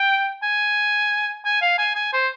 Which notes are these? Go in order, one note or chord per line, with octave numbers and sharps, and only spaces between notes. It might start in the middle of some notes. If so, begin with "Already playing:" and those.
Already playing: G5
G#5
G#5
F5
G#5
G#5
C5